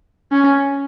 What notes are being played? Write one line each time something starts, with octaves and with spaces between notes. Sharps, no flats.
C#4